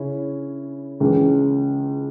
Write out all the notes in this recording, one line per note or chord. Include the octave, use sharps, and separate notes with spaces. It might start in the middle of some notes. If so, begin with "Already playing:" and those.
Already playing: C#3 C#4 E4
C#2 C#3 E3